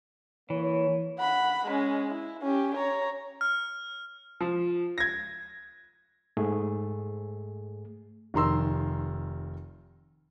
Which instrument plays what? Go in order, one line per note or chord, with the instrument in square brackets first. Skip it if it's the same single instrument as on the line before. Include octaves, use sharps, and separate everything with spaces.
[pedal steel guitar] E3 [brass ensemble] A#3 C#5
[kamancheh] F#5 B5
G#3 C#4
E4
C#4 G4
C#5 A#5
[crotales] F6
[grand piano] F3
G#6 A#6
[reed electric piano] G#2 A3 G#4
[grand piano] F1 D#3 A#5 C6 E6